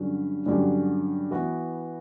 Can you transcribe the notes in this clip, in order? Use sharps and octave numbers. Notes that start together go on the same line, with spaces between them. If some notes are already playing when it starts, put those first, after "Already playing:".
Already playing: G2 D3 F#3 C#4
G2 D3 F#3 C#4 G4
E3 B3 F#4